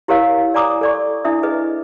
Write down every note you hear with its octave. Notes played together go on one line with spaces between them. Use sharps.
E4 G4 A#4 C#5 F5
D5 G#5 A#5 D6 D#6
A4 D5 C#6
D4 E4 E5 D#6
G#4 B4 D#5